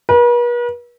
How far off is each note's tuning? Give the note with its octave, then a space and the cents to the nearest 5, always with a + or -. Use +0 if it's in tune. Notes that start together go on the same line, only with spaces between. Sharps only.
B4 -45